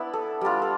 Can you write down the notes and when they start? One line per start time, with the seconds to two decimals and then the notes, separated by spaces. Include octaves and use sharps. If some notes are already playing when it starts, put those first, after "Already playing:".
Already playing: B3 D4 E4
0.13 A4
0.41 G3 D4 F4
0.62 A4